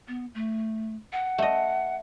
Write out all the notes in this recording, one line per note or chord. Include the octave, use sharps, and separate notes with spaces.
B3
A3
F#5
A3 D#5